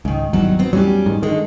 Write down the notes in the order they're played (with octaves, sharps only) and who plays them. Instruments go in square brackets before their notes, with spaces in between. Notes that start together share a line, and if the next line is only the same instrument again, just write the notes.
[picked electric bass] C#2 [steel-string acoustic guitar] G#2 D#3
[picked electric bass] G#1 E2 [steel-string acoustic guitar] D#3 F#3 G3
[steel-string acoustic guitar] B3 C4
[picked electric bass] E2 A2 F#3 [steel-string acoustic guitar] G3 C#4 G4
[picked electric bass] G#2 D#3
[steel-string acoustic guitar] D3 G#3 A4 [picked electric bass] D#3